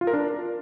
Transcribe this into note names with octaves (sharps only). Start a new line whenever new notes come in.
F4
A#4
D4